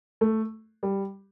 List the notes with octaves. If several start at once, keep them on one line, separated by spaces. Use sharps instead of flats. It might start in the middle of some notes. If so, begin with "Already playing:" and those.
A3
G3